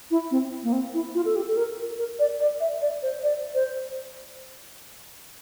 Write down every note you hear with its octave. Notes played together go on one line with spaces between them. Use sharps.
E4
C4
A#3
C4
E4
F4
A4
G4
A4
A#4
A#4
D5
D5
E5
D5
C5
D5
C5